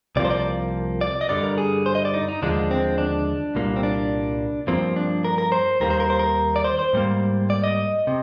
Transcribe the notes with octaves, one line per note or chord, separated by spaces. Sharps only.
C2 C3 F3 A#3 D5
C5
D5
D5
D#5
G2 D3 G3 D5
A#4
G#4
C5
D#5
D5
D#4
D#4
D#2 D3 F3 G#3 D4
C4
D4
C2 A#2 G3 A#3
C4
D4
G2 F3 A#3 C4
D4
A#4
A#4
C5
D#2 D#3 G3 A#3 A#4
C5
A#4
C5
A#4
D5
C5
C5
G#2 G3 A#3
D5
D#5
C3